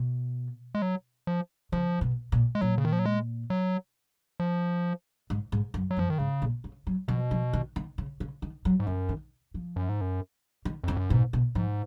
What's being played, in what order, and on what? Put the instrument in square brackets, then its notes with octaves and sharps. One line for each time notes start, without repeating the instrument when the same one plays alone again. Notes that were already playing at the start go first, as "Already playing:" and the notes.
Already playing: [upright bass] B2
[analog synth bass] G#3
F#3
F3
[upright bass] C#3 [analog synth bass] F3
[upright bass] B2
A#2
[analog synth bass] G#3
[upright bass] A#2 [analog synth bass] F#3
[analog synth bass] C#3
D#3
F3
F#3
G#3
F#3
F3
[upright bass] G#2
G#2
F#2
[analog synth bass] F#3
[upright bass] F#2 [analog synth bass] F3
[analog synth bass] D#3
[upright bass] G#2 [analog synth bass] C#3
[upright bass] A#2
C#3
F#3
[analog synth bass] B2 [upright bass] F3
[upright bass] F3
D#3
D#3
C#3
C#3
D#3
F#3
[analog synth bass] G#2
[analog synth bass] F#2 [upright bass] F3
[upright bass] D#3
F3
[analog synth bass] F#2
G#2
F#2
[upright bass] D#3
[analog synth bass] F2 [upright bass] C#3
[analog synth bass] F#2
[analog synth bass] G#2 [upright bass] B2
[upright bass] B2
[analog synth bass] G#2 [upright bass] F3